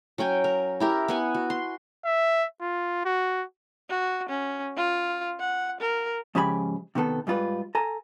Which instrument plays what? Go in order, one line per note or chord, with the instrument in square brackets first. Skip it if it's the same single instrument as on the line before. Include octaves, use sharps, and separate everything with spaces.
[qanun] F#3 C#4 G5 G#5
A#4
E4 G4 A#4
B3 F#5 G#5
F#4
C6
[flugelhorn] E5
F4
F#4
[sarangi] F#4
C#4
F4
F#5
A#4
[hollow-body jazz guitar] G#2 C#3 F3 G4 G#5 B5
C3 D#3 B3 A4
G#2 G3 F4 B4
A4 G#5 A#5